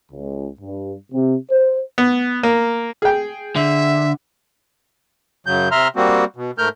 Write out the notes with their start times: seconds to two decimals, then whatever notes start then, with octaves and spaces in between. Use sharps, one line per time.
0.12 C#2
0.60 G2
1.12 C3
1.51 C5
1.98 B3
2.43 A#3
3.02 G#4 G5
3.56 D3 E5
5.47 F#2 C#3 F#3 G6
5.71 C3 E5 A#5 C6 F6
5.96 G3 A#3 C4 F#4
6.36 B2
6.58 G#2 A3 A#4 F6 G6